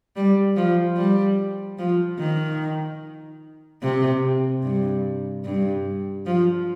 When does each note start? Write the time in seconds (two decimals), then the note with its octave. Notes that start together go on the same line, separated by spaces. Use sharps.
0.16 G3
0.56 F3
0.97 G3
1.78 F3
2.19 D#3
3.82 C3
4.63 G2
5.45 G2
6.26 F3